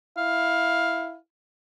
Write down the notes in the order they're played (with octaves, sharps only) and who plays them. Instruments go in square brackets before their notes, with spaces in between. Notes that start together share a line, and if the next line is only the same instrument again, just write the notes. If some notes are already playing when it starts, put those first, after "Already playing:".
[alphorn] E4 [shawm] F5